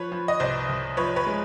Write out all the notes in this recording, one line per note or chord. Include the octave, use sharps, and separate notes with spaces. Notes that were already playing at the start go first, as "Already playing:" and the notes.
Already playing: F3 B4 C#5
F3
D#5
C2 C5 D5
C2
F3 B4 C#5
B4 C#5
G#3